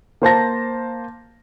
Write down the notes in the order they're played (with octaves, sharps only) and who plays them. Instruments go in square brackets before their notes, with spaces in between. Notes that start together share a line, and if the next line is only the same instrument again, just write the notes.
[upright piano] A#3 C5 A5 A#6